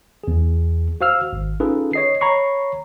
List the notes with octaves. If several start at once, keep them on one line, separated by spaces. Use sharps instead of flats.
E2 G#4
F#4 C5 F5 E6 F6
G#1
C#4 D#4 F4 G#4 A4 B4
C#5 D#5 C7
C#5 A#5 B5 C#6 C7